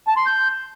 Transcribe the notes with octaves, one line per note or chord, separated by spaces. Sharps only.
A5
C6
G6